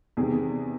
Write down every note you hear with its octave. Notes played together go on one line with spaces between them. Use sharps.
E2 C3 D#3 G#4